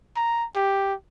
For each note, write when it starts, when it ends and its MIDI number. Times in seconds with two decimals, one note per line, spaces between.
0.16 0.45 82
0.55 0.94 67